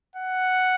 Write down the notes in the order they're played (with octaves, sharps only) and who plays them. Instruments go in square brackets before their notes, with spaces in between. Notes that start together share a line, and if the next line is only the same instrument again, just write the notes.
[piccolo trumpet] F#5